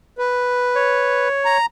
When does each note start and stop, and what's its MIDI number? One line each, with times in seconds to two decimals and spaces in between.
0.18 1.29 71
0.75 1.58 73
1.45 1.66 82